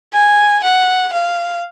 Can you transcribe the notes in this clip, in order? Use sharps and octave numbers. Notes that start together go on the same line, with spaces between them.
G#5
F#5
F5